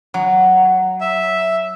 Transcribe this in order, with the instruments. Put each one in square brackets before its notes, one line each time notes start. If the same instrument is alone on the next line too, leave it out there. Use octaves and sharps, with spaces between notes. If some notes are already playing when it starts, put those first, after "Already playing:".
[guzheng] F#3
[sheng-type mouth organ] E5